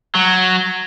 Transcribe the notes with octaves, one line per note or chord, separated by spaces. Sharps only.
F#3